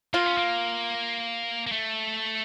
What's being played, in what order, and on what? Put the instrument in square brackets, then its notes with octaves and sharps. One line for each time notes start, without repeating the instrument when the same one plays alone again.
[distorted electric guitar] A#3 [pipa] F4
[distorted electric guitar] C#4
A#3
A#3
A3